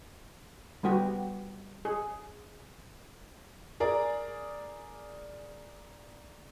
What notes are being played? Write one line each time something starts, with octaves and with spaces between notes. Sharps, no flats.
G3 B3 F#4 G4
G#4
G#4 A#4 D5